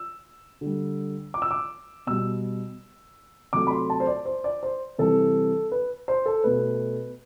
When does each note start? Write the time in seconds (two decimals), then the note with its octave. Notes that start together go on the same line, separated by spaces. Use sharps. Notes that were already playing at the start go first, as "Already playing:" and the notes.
Already playing: E6
0.61 D3 G3
1.34 D6
1.42 E6
1.51 D6
2.07 B2 G3 E6
3.53 C3 F#3 A3 D6
3.67 B5
3.71 C6
3.90 A5
4.00 C5
4.07 D5
4.25 C5
4.44 D5
4.63 C5
4.99 C3 E3 G3 A4
5.71 B4
6.08 C5
6.26 A4
6.44 B2 A3 B4